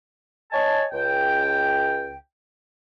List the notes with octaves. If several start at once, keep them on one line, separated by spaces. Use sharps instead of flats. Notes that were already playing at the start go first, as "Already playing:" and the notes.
C#5 D#5 G#5 A5
C#2 G5